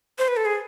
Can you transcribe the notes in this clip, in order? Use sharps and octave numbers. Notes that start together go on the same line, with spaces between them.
C5
B4
A4
G#4